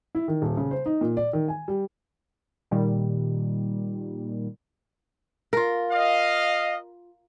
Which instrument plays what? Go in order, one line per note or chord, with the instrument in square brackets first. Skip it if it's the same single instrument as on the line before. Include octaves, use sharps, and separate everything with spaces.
[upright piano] E4
D#3
D#1
C#3
C5
D#4
A#2
D5
D#3
G#5
G3
[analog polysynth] A#2 D#3 G3
[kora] F4 A#4
[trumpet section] D#5 F5